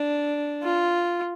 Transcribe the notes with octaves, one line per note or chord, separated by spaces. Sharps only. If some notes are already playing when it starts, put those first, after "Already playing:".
Already playing: D4
F4